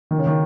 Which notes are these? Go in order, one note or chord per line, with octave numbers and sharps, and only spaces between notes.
D#3
C#3
D#3